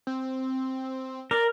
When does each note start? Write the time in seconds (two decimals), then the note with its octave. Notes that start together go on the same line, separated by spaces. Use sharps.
0.07 C4
1.31 A#4 D5